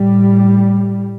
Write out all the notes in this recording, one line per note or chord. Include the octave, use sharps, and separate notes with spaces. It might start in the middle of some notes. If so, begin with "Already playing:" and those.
Already playing: A2 G3